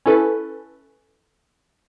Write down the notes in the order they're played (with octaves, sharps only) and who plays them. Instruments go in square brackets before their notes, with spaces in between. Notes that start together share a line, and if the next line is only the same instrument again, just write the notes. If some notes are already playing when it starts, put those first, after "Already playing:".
[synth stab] C#4 E4 A4 B4